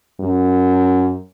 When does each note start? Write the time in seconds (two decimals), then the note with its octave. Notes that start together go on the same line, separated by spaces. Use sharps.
0.20 F#2